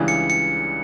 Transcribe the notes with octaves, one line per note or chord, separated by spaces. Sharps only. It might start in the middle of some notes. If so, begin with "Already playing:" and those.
Already playing: C#2 C#3 E3 G3 D4
C#7
C#7